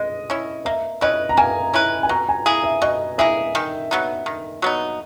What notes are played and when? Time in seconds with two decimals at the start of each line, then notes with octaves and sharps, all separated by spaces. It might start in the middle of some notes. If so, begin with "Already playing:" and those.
Already playing: G#3 D#5
0.30 C#4 E4
0.65 A#3 E5
1.01 C#4 E4 B4 D#5
1.29 A#5
1.37 A#3 G#5
1.74 C#4 E4 B4
2.03 G#5
2.09 B2 A#5
2.29 G#5
2.46 A#3 E4 G#4
2.64 E5
2.82 B2 D#5
3.18 A#3 E4 G#4 E5
3.55 D#3
3.91 F#3 B3 D#4
4.26 D#3
4.62 F#3 B3 D#4